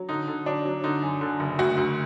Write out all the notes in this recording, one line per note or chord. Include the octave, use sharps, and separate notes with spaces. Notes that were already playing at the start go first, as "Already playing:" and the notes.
Already playing: F#3
D3 D#4
D3
F#3 D4
F#3
D3 D#4
F#2
D3
F#1
D2 F#4
D2